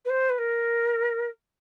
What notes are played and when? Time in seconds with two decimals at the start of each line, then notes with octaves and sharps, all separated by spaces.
0.05 B4
0.09 C5
0.29 B4
0.38 A#4